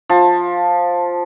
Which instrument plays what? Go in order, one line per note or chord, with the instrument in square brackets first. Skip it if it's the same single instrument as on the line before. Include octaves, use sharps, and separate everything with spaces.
[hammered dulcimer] F3